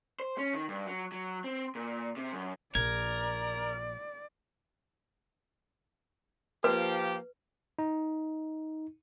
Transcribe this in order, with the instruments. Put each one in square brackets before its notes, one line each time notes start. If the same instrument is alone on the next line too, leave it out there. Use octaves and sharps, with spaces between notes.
[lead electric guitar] C5
C#4
D#3
G2
F#3
F#3
C4
A#2
C3
F#2
[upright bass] A#1 [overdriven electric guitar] A#4 [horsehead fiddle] D5 [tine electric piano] G#6
[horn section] F3 A#3 G4 [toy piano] B4
[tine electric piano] D#4